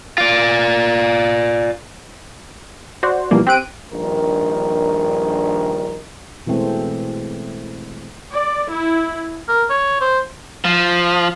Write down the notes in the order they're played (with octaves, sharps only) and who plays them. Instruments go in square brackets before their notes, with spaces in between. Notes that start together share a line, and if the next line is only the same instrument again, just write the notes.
[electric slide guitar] F4 D5
[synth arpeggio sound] F#4 C5 D5
B2 E3 F3 G3 A#3
C4 G4 F#6 D7 D#7
[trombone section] A#1 G2 D#3 A#4
[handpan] B2 E3 G#3 A3 C4
[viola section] D5
E4
[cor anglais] A#4
C#5
C5
[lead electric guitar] F3